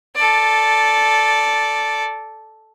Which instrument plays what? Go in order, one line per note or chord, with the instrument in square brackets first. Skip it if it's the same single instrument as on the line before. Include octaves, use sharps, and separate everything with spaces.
[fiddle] A4 D5